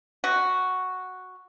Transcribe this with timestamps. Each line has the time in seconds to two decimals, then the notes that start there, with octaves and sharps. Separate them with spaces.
0.24 F#4